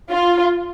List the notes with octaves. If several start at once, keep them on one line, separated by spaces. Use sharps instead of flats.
F4